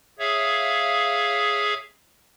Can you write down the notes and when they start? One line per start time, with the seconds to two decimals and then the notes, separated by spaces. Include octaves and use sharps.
0.19 G#4 C#5 E5 F5